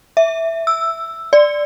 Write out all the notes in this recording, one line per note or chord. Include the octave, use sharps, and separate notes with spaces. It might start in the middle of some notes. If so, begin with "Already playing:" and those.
E5
E6
D5